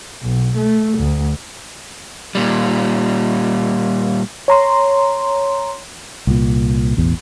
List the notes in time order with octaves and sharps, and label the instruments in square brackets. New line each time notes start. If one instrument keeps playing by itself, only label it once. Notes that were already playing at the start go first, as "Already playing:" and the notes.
[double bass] B1
A3
D2
[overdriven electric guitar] A#2 G3
[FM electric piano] C#5 A#5 C6
[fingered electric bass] C2 A#2
E1 A1 E2